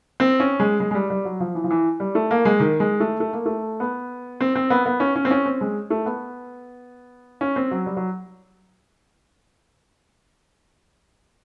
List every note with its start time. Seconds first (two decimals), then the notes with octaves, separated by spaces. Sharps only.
0.20 C4
0.40 C#4
0.60 G#3
0.80 G#3
0.91 G#3
0.95 G3
1.10 G3
1.25 F#3
1.40 F3
1.55 E3
1.64 F3
1.71 E3
2.00 G3
2.15 A3
2.31 A#3
2.45 G#3
2.60 D#3
2.80 G#3
3.00 A3
3.20 A3
3.33 A#3
3.46 A3
3.80 B3
4.41 C4
4.55 C4
4.70 B3
4.86 B3
5.00 C#4
5.16 C#4
5.25 C4
5.31 C#4
5.46 C4
5.61 G#3
5.90 A3
6.06 B3
7.41 C#4
7.56 C4
7.71 F#3
7.86 G3
7.97 F#3